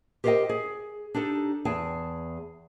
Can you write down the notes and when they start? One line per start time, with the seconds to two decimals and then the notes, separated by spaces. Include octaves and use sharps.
0.24 G4 A#4 C5 D5 D#5 G5
0.49 G#4
1.14 D4 D#4 G4 A4
1.65 E2 G#4 G5 A5